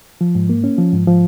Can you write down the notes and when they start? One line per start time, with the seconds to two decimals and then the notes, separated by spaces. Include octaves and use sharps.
0.21 F3
0.35 G#2
0.49 A#3
0.64 C#4
0.78 F3
0.93 G#2
1.08 F3